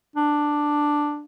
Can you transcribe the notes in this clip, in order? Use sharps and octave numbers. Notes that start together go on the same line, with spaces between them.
D4